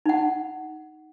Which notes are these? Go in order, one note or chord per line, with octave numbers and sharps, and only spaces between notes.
D#4 F#5